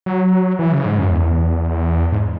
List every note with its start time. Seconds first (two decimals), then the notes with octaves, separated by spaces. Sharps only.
0.06 F#3
0.59 E3
0.72 C#3
0.85 G#2
0.99 F#2
1.11 E2
2.12 G#2